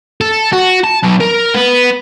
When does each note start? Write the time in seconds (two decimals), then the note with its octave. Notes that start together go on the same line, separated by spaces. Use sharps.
0.21 A4
0.53 F#4
0.84 A5
1.04 F#3 B3
1.21 A#4
1.54 B3